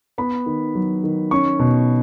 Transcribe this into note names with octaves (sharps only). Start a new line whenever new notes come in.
B3 B5
D#3
F#3
D#3
C#4 C#6
B2